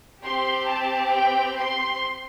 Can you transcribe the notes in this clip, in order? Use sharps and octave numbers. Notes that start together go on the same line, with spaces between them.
C4 G4 C6
A5
G5
C6